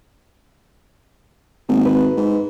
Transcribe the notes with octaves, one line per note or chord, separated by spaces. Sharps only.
G#1 A#3 B3
B4
G#2